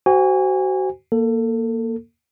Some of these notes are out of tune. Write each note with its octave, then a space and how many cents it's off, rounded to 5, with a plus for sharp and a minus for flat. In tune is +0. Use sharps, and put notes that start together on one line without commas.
F#4 +30 C5 -15 G#5 -25
A#3 +0 A4 +25